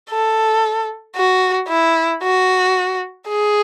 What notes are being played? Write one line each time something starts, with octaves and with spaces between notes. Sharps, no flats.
A4
F#4
E4
F#4
G#4